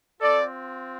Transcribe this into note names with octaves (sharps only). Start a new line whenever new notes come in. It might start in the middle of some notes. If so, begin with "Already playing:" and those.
C4 F4 A4 D5